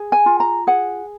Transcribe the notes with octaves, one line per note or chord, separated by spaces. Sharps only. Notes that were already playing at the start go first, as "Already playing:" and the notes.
Already playing: G#4
G#5
F4
A#5
G#4 F#5